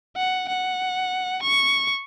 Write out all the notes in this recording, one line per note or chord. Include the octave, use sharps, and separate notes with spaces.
F#5
F#5
C#6